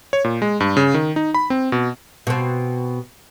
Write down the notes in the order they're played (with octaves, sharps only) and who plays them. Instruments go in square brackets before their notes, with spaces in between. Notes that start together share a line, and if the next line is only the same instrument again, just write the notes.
[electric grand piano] C#5
A#2
G#3
G2
C#3
D#3
D#4
B5
C4
B2
[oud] B2 C4